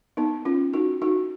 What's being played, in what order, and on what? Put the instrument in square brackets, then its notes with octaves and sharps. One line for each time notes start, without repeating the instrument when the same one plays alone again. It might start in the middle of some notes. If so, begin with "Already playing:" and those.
[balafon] B3 D#4
C#4 F4
D#4 F#4
D#4 F#4